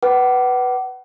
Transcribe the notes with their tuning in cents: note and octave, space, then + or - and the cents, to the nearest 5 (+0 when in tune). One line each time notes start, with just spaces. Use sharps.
B4 +0 F#5 +35 D6 +0